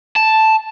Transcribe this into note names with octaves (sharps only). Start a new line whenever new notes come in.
A5